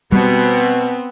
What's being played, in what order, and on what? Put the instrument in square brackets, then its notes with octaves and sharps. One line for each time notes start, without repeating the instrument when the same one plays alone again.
[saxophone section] B2 [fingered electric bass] G3 [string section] B3 C4